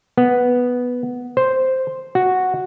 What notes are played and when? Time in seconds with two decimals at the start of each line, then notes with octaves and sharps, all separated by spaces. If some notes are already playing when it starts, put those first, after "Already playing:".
0.17 B3
1.37 C5
2.15 F#4